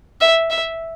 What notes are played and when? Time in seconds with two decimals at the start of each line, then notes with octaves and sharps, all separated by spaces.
0.21 E5
0.50 E5